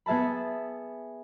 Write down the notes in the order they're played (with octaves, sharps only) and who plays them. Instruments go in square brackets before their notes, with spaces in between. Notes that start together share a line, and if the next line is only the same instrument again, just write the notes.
[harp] B3 G#4 E5 A5 B5